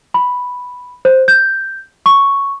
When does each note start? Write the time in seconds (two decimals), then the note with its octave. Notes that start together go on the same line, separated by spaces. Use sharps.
0.14 B5
1.05 C5
1.28 G6
2.06 C#6